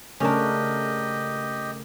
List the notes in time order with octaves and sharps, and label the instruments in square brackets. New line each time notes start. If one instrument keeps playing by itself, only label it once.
[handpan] C#3 A3 A#4 [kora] C#4 D4 [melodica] G4 D#5